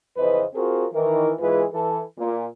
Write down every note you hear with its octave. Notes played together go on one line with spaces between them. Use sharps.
F2 C#3 E3 B4 C5 D#5
C4 F4 F#4 G#4 A#4 C5
D#3 E3 A#4
G#2 E3 G#3 F4 G#4 B4
E3 A4
A#2